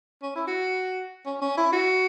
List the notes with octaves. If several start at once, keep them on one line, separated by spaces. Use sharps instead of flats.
C#4
E4
F#4
C#4
C#4
E4
F#4